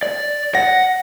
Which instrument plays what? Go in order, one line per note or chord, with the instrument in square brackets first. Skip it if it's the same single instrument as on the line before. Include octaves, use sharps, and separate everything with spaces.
[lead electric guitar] D5
[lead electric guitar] F#5 [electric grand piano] A#6